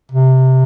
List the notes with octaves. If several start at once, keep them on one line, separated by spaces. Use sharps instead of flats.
C3